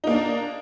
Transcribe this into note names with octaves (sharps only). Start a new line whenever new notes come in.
A#3 D4 D#4